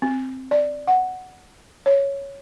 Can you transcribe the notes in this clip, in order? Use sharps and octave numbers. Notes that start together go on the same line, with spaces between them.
C4
D5
F#5
C#5